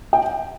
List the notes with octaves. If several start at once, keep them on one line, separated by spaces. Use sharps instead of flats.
G5